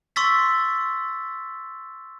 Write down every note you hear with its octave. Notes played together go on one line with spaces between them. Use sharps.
C6 C#6 E6 A6 B6